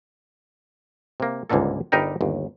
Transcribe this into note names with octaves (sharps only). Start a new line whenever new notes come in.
C3 A#3
G1 C#2 G#2 D3 A#3 A4
G1 G3 D#4 G4 A#4 G5
G1 D#2